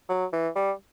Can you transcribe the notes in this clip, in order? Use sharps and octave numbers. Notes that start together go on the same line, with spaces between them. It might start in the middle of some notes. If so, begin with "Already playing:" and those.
F#3
E3
G3